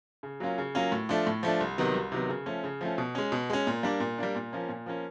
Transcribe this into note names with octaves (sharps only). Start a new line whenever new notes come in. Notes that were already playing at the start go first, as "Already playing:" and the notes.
C#3
F#3 A#3 C#4 F4
C#3
F#3 A#3 C#4 F4
A2
F3 A3 D4
A2
F3 A3 D4
C2
C3 D#3 F#3 B3
C2
C3 D#3 F#3 B3
C#3
F3 A3 C#4
C#3
F3 A3 C#4
B2
G#3 C#4
B2
G#3 C#4
A#2
G3 A#3 D4
A#2
G3 A#3 D4
A#2
F3 A#3 C#4
A#2
F3 A#3 C#4